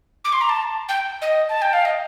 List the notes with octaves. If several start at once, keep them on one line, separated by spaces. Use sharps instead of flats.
D6
C6
A#5
A5
G5
D#5
A5
G5
F5
D#5